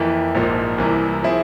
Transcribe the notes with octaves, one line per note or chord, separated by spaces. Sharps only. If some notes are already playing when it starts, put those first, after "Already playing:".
Already playing: F2 E3 A#3 E4
A#1 G#2 F3 A#3
C2 C3 E3 A#3
F3 C4 E4 G#4